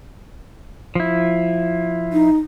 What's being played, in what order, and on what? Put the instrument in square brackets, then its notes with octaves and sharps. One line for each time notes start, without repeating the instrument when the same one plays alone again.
[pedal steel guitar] F3 E4
[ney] D#4